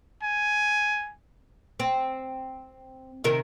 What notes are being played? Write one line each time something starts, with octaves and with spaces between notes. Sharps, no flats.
G#5
C4
C3 D#3 A#4